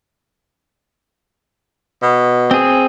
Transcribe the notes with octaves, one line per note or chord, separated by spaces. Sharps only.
B2
C4 G#4